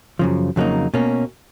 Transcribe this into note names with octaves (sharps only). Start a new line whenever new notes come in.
F#2 C#3 F3
F2 C#3 F#3 A#3 D#4
B2 A#3 C#4